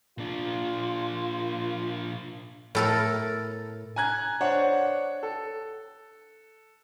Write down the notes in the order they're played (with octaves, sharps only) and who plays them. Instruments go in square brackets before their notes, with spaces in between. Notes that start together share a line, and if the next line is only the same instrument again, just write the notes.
[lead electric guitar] A#2 D4 [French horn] F4
[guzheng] A2 A4 A#4
[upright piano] G#5 A#5 F#6 G#6
D4 C5 C#5 F#5
A4